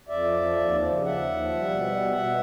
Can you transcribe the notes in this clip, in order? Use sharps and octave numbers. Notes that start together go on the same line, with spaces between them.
F2 D5 E5
F3
F3
D#2
F3
C#3
D#2 E5 F#5
D#2
F3
G3
B2
G3
B2
B2